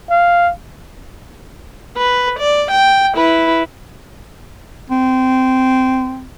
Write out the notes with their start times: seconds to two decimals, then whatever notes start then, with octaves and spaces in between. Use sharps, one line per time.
0.10 F5
1.98 B4
2.39 D5
2.71 G5
3.16 E4 B4
4.90 C4